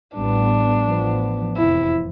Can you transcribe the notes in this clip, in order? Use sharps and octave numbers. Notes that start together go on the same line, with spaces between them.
A1 A2 G3 B3 D4
A1 A2 F3 B3
F1 E2 C3 F3 E4